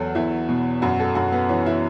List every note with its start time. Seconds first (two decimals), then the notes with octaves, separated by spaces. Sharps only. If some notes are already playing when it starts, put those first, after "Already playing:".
Already playing: E2 F#3 F#4 A4
0.15 E2 E4
0.49 B2
0.82 F#2 F#4
0.99 A4
1.15 F#2 F#4
1.32 B3
1.49 E3 C#4
1.66 E4